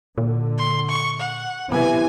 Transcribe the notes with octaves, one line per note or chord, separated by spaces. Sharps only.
A#2 D3
C6
C#6
F#5
C3 E3 B3 G#5